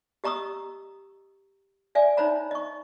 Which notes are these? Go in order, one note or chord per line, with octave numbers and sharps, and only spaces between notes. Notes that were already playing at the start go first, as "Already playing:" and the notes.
G4 D#5 A#5 C#6 D#6 E6
D5 E5 G#5
D4 D#4 C5 C#5 A#5 B5
D#5 C#6